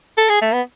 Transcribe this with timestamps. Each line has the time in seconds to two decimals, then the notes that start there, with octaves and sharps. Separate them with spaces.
0.18 A4
0.29 G#4
0.42 A3
0.53 B3